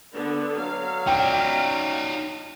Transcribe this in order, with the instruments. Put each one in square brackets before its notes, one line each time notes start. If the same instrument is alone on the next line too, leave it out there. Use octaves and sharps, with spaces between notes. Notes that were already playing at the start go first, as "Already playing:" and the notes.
[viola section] D3 B3
[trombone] F#3 [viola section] F5
[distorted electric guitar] D#4 D5 [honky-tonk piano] G5